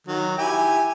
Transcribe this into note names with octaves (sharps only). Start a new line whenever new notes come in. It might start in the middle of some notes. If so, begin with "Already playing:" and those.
D#3 F#3
E4 G4 G#5